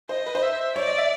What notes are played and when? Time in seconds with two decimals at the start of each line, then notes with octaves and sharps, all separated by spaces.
0.09 C5 D#5
0.26 B4
0.35 C5
0.43 E5
0.76 C#5 D5
0.87 D#5
0.98 E5